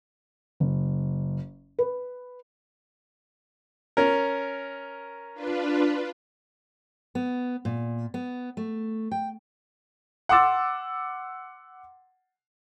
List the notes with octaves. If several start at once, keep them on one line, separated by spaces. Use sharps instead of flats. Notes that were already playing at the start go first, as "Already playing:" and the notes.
F#1
B4
C#4 A#4
D4 F4 B4
B3
A#2
B3
A3
G5
F#5 C6 D6 E6 A6